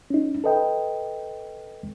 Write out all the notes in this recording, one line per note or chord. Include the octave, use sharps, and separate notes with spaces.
C#4 D#4
A4 B4 D#5 G5